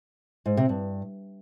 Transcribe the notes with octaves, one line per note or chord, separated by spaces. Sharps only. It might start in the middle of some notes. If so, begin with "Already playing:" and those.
G#2
C3
G2